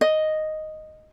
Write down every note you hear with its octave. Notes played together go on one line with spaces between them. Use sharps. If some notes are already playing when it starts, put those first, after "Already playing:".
D#5